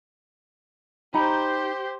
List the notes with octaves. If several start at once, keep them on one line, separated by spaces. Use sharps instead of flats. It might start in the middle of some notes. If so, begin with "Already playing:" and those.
D#4 G4 C5 A#5 B5